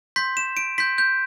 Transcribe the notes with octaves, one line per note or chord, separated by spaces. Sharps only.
C6 G6 B6
E7
D7
C6 G6 B6
G6